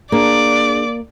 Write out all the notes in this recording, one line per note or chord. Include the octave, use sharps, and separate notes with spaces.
A#3 D4 G#4 D5